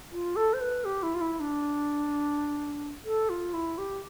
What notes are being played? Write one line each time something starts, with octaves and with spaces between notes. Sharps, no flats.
F4
A4
C5
B4
G4
E4
F4
E4
D4
A4
F4
E4
G4